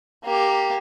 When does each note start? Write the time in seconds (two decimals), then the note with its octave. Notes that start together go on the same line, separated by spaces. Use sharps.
0.25 A#3 G4